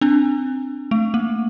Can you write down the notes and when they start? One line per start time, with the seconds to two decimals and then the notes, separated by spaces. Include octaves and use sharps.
0.01 C4 D4
0.91 A3
1.14 A#3